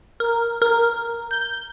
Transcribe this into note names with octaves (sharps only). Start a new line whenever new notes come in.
A#4
A#4
G6